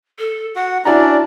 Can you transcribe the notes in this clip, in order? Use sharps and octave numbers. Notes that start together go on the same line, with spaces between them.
A4
F#4 F#5
C#4 D4 E4 F#4 D5 A#5